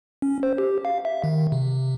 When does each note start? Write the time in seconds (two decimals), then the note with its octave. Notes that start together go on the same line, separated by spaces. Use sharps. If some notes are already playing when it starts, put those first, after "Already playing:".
0.22 C#4
0.43 C5
0.58 G4
0.85 F5
1.05 E5
1.24 D#3
1.52 C3